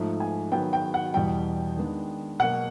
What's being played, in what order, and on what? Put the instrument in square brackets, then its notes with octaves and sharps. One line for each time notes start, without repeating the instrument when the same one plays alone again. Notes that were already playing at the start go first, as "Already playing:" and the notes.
Already playing: [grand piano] G#2 F3 A3
[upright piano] G#5
[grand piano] D#3 F#3 B3 [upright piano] G5
[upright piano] G5
F#5
[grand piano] E2 B2 G3 [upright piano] G5
[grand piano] D#3 G#3 B3 D4
[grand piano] B2 F#3 A#3 [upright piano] F#5